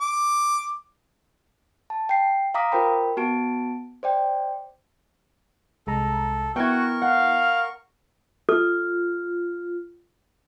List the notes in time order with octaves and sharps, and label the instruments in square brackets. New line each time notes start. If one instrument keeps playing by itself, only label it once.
[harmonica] D6
[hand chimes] A5
G5 C7
F5 A#5 D6 D#6 B6
F4 A#4 C5 G5 B5
B3 F#4 A5 D7
C5 D5 G5
[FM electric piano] C2 G#3 A#5 [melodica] A4
[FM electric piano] B3 E4 [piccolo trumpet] F#4 [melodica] A#4 C#6 [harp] G5 G#6
[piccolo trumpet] F5 [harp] F#5
[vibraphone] F4 [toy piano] A4